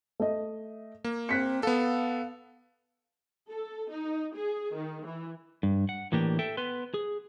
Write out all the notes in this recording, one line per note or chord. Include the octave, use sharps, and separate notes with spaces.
A3 D#5
A#3
C4 F#6 B6 C#7
B3 A4 F5
A4
D#4
G#4
D#3
E3
G2
F#5
A2 E3 A#3 D4 G4
A4 E5 G5
B3 B4 C6
G#4